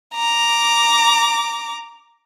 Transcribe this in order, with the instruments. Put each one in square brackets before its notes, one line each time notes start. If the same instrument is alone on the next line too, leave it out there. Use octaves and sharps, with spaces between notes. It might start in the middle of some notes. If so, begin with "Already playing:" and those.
[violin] A#5 D6